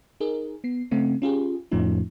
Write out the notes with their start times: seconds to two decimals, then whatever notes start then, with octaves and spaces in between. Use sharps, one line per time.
0.20 D#4 G#4 A#4
0.64 B3 C7
0.91 C#3 A3 C4
1.22 C#4 F4 G4 G#4
1.71 F2 A2 F3 A3 C#4 D#4